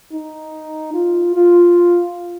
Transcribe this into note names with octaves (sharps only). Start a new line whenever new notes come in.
D#4
F4
F4